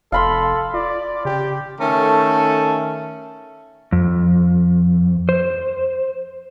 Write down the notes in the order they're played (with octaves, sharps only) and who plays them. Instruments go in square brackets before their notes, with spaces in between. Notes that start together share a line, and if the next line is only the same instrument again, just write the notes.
[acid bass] F1 [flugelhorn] A4 [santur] F5 B5 C6
[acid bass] F4 [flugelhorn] D5
[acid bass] C#3 [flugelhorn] G4
[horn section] D#3 A3 C#4 A4
[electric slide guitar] F2
C5